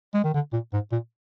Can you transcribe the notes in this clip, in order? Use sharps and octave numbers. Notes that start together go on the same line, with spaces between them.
G#3
D#3
D3
A#2
G#2
A#2